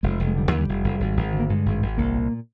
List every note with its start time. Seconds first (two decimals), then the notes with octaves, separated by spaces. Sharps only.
0.03 F1 G#3
0.20 F1
0.28 G#3
0.35 D3 G3
0.48 D#2 F3
0.59 G3
0.68 F1
0.84 F1
1.00 G#1
1.17 G#1
1.33 D3
1.40 A#3
1.49 G2 G#3
1.66 G#1
1.82 G#1
1.98 C2 A#3
2.15 A#2